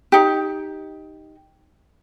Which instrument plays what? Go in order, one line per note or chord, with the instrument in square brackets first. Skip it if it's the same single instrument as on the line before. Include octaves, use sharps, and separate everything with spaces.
[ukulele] D#4 G4